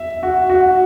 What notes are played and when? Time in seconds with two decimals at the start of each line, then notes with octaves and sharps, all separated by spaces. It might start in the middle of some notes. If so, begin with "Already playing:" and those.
Already playing: E5
0.23 F#4
0.50 F#4